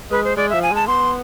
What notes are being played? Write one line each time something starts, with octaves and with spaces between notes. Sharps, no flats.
G#3 B4
C5
G#3 D5
F3 E5
G#5
G#3 A5
B3 C6